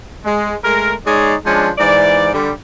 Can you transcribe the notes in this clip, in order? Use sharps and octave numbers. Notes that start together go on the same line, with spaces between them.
G#3
G#3 A3 A#4
G#3 D#4 G#4 C#5 D5
F3 G#3 C#4 D4
G#2 E3 D5
D3 G3